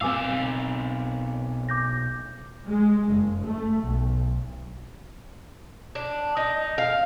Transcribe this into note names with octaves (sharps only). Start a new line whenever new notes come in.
B1 A#2 C4 F5 G#5 D6 E6
D6 G6 A#6
G#3
F#1
A3
B1
D4
D#4
F5